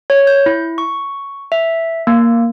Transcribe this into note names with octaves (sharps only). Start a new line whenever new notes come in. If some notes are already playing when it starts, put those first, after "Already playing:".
C#5
G6
E4
C#6
E5
A#3